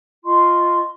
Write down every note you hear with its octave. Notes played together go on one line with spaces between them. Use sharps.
F4 D#5 C6 C#6